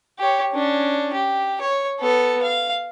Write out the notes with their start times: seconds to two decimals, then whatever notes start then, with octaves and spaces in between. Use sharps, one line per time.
0.19 G4 C#5
0.53 C#4 D4
1.14 G4
1.61 C#5
2.00 B3 A4
2.43 F5